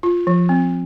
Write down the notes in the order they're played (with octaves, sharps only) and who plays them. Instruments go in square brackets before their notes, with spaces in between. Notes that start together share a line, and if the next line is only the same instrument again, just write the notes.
[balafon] F4
F3
C4